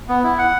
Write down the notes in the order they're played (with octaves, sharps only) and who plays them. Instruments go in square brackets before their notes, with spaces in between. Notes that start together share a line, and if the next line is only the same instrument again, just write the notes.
[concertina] B3
E4
F#5